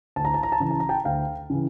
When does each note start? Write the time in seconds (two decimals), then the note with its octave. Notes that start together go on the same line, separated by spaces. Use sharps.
0.16 D2 A5
0.25 A#5
0.34 A5
0.43 A#5
0.52 A5
0.60 C#3 E3 A#5
0.71 A5
0.80 A#5
0.89 G5 A5
1.05 D2 F5 G5
1.50 C#3 E3